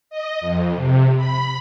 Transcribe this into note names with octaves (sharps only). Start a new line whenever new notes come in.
D#5
F2
C3
B5